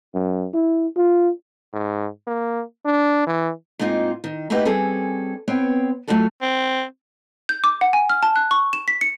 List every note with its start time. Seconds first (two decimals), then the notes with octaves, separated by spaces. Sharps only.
0.14 F#2
0.54 E4
0.97 F4
1.73 G#2
2.27 A#3
2.85 D4
3.27 E3
3.79 G#2 A#3 C4 D#4 F4
4.24 D#3
4.50 A3 A#3 D#4 F#4 G4 B4
4.65 G3 C4 C#4 G#4 A4
5.48 B3 C4 C#5 G5
6.08 F#3 A3 C#4 F4 F#4 A4
6.42 C4
7.49 G6
7.64 D6
7.81 F#5
7.93 G#5
8.10 F6
8.23 A5
8.36 F#6
8.51 C#6
8.73 E7
8.88 B6
9.01 C#7